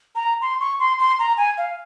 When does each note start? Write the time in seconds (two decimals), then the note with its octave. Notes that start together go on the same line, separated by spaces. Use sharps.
0.15 A#5
0.42 C6
0.60 C#6
0.80 C6
0.99 C6
1.19 A#5
1.37 G#5
1.58 F5